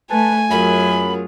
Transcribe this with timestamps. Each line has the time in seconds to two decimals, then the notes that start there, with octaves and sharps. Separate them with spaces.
0.11 A3 B4 G#5 A5
0.51 F#2 F#3 F4 G#4 B5